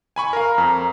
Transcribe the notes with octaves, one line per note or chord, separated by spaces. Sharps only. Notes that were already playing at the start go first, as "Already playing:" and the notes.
G#5 B5 C#6
A#4 F5 A#5
F2